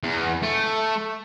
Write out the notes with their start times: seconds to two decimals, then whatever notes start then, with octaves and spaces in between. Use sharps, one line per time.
0.04 E2
0.42 A3